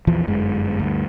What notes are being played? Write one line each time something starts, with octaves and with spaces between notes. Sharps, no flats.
A#1 E2 E3 F3
G1 F#2 G#3
D2 G2